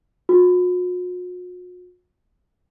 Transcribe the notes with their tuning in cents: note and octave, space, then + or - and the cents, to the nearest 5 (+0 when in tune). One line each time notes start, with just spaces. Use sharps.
F#4 -45